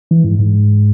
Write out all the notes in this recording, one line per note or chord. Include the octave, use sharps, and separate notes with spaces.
E3
G#2
G#2